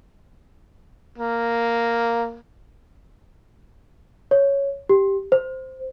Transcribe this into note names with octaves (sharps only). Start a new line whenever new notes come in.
A#3
C#5
G4
C5